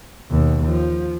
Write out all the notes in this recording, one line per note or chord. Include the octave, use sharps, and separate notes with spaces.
D#2 B2
F3